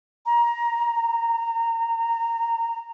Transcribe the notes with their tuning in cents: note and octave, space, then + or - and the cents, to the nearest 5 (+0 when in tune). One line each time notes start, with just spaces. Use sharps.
A#5 +20
A#5 -20